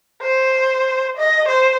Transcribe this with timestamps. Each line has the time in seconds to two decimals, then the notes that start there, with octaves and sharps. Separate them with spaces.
0.21 C5
1.17 D#5
1.48 C5